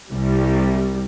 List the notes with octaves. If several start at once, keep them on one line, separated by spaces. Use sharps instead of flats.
C2 G3